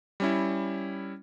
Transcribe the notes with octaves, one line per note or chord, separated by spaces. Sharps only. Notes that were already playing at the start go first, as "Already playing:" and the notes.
G3 C#4 E4